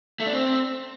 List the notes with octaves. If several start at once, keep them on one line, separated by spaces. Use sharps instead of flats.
A3
D4
C4